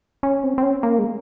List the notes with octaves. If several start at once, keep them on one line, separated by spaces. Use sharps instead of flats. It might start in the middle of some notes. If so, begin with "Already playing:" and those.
C#4
C4
C4
C#4
A#3
G#3